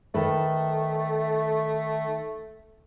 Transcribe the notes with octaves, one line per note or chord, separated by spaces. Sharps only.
D#3 A3 A4 B4